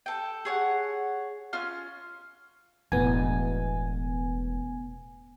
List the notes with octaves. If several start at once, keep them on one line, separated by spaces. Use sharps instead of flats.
A4 G5
G#4 C#5 F#5
C#4 F4 F6
E1 A2 B3 G#5